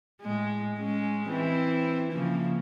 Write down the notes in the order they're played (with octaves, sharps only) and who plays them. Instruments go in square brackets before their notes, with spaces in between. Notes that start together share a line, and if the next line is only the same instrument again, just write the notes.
[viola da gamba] A2 G#3
G#3 C#4
E3 C4 E4
C#3 F3 A#3